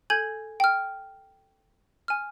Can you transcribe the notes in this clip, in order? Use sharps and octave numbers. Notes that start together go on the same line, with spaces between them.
A4 G#5 G6 G#6 F#7
G5 F6
G#5 F6